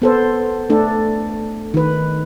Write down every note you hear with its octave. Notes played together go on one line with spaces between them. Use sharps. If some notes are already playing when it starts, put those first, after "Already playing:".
B3 A4 C5
A3 D4 A4
D#3 B4